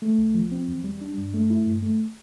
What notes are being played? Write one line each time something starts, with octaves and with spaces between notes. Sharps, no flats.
A3
C2
F3
C4
E2
G3
D4
G2
A3
E4
G2
A3